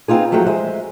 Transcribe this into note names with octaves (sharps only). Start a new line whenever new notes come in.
B3 C4 D#4 F4 G#4
F3 F#3 A3 F#4 G4
G#3 C5 E5